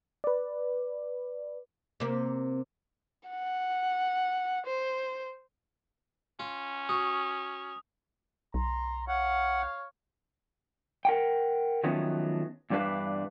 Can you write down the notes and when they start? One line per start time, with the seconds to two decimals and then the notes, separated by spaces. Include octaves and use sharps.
0.24 B4 D5
2.00 C3 A#3
3.29 F#5
4.67 C5
6.39 C#4 F4
6.89 F#4 D#6
8.54 B1 A#5 C6
9.08 C#5 F5 F#5
11.05 A#4 F#5 G5
11.84 D#3 F3 F#3 A3 B3 C#4
12.70 E2 G2 G3 D4 B4 F5